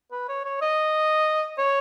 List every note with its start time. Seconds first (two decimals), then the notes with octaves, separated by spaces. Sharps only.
0.12 B4
0.28 C#5
0.45 C#5
0.61 D#5
1.58 C#5